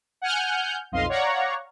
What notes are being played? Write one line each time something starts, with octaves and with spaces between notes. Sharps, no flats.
F#5 G#5 F6 G6
B1 F2 D#5 F5 C6
C#5 D5 F5 F#5 A#5 C#6